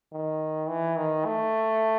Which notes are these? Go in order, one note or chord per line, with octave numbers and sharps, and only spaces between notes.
D#3
E3
D#3
A3